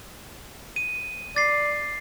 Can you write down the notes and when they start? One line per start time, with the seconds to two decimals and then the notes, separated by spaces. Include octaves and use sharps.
0.76 D#7
1.36 D5 A6 C7